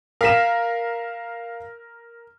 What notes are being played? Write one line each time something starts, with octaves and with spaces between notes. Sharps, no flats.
A#4 F5 B6 E7